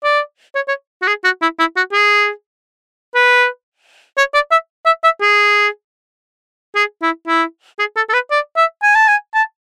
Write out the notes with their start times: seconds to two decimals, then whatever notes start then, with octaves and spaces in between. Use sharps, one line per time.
0.04 D5
0.55 C#5
0.68 C#5
1.02 F#4
1.07 G#4
1.24 F#4
1.42 E4
1.59 E4
1.76 F#4
1.93 G#4
3.15 B4
4.18 C#5
4.34 D5
4.51 E5
4.86 E5
5.04 E5
5.21 G#4
6.75 G#4
7.02 E4
7.28 E4
7.79 G#4
7.96 A4
8.09 A4
8.13 B4
8.31 D5
8.57 E5
8.83 G#5
8.95 A5
9.08 G#5
9.34 A5